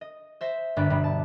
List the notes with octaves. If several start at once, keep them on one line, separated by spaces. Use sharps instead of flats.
D#5
C5 E5 A#6
G1 G2 D5 F#6 B6
G2 B2 G3
A5